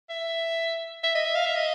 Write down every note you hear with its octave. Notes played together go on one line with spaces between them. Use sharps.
E5
E5
D#5
E5
F5
E5
D#5